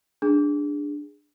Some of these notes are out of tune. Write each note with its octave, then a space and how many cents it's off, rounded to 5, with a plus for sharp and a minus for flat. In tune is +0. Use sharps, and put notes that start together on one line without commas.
D4 +0 G#4 -10